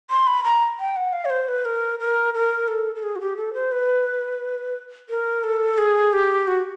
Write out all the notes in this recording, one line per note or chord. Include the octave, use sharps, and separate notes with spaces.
C6
B5
A#5
G5
F#5
F5
C#5
C5
B4
A#4
A#4
A#4
A4
A4
G#4
F#4
G4
A4
C5
B4
A#4
A4
G#4
G4
F#4